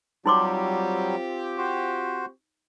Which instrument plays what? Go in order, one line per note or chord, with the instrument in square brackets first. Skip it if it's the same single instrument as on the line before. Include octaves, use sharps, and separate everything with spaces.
[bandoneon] F#3 G3 [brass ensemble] C4 F4 G4 [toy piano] D#4 C6 D6
[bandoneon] F#4 C5